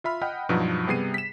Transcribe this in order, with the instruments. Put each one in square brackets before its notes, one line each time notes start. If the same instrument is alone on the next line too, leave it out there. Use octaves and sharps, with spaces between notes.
[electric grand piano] F4 E5 B5 F6
D#5 F#5 G5 B5 F6
G2 B2 F3 F#3 B3 D#4
C3 G3 B3 G#4 C7 D#7
B6 E7